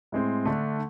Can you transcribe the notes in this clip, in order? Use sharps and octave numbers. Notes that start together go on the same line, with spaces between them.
A2 G#3 C4
D3 A3 D4